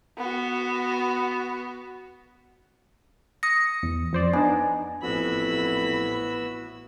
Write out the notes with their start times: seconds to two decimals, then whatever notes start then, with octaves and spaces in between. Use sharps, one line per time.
0.17 B3 F#4
3.43 D#6 A#6 C#7
3.83 E2
4.13 F2 C5 D5
4.33 B3 D4 D#4 G#5
5.03 A1 F2 B3 E4 F#4 B5 E6